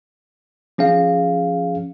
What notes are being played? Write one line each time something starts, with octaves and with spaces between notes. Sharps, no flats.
F3 C#4 G#4 F5